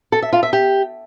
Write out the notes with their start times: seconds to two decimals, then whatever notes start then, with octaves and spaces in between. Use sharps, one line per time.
0.12 A4
0.22 E5
0.33 F4
0.43 E5
0.53 G4